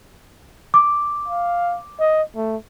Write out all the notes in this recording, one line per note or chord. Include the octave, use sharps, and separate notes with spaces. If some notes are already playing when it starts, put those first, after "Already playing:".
D6
F5
D#5
A3